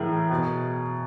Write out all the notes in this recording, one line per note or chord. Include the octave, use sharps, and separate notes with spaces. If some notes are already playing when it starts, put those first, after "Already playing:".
Already playing: A2 E3 G#4 A#4
B2